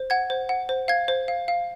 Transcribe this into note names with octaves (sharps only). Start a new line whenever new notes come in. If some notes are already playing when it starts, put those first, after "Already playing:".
Already playing: C5
F#5 G#6
C5
F#5
C5
F5 G#6
C5
F5
F5